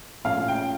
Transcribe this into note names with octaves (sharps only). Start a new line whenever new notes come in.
A#1 A#2 A3 C#4 F5
G5